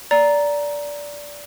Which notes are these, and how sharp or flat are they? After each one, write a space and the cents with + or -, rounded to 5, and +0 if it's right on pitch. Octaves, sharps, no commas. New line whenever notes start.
D5 -15 A#5 +0